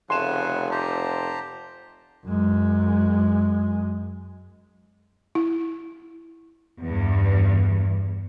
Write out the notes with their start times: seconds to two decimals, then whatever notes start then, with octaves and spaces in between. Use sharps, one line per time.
0.10 F1 C#3 A3 F#5 G#5 C6 E7
0.71 G4 C5 A5 A#5
2.27 F#2 G#3
5.35 E4
6.83 E2 G2